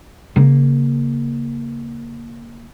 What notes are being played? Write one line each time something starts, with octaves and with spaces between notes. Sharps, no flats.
C#3 A#3